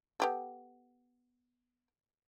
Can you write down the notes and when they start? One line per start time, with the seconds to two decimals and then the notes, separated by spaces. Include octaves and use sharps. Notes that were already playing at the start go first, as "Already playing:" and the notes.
0.20 B3 G4 A4